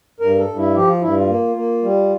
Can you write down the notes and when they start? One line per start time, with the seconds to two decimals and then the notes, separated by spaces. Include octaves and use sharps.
0.20 G2 A#4
0.38 A4
0.47 G2
0.57 E4
0.74 F3 G4
0.88 F4
1.02 G2 E4
1.17 F4
1.29 A#3
1.56 A#3
1.83 G3